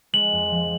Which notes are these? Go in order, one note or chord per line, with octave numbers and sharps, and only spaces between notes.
G#3 F#7
F2
F3